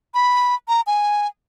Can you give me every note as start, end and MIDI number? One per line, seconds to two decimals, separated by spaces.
0.14 0.55 83
0.68 0.81 82
0.87 1.27 80